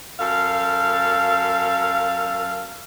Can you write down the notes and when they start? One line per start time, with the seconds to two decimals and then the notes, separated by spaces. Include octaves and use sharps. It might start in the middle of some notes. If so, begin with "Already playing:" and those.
0.19 F#2 A4 F5